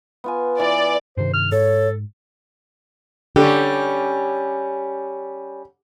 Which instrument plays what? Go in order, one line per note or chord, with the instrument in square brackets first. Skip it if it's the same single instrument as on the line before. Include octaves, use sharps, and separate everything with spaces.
[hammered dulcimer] B3 F4 G#5
[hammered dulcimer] E3 [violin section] D5
[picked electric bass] G2 C3 D#3 [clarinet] C5
[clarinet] F6
[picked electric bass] G#2 [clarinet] A4 [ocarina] C#5
[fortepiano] D3 [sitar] G3 C#4 [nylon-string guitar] G4